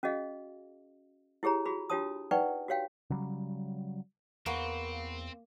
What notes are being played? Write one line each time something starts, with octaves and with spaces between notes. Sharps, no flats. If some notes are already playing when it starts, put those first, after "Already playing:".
C#4 F#4 G#4 D#5 F5
E4 G4 G#4 C#5 A#5
F4 F#4 G#4 B5
D4 F4 G4 C#5 A5 D#6
D#4 B4 D5 F#5 G5 C#6
F#4 G4 C#5 F5 G5
C#3 F#3 G3
E2 A#3 C4 F#4 B4 C5